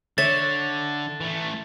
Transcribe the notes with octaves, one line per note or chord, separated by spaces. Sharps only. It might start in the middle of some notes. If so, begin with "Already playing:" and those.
D3 C#5 E5 A6
E3 A3